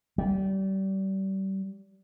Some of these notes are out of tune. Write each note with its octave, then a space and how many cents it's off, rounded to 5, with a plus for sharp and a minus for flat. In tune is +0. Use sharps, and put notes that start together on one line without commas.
G3 -30